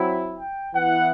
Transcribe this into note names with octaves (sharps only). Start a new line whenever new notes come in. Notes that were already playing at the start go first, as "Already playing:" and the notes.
Already playing: F#3 C4 E4
G5
E3 B3 E4 F#5